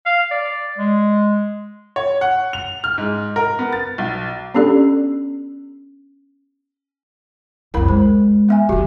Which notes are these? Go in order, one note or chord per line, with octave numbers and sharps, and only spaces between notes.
F5
D5
G#3
C#5
F#5
F7
F6
G#2
A#4
B3
A6
B1
B3 C#4 D4 G4 A4 D5
C2 F2 E4 A#4 B5
G#3 C5
B3 E5 G#5
C#2 D3 F#3 F#4 G4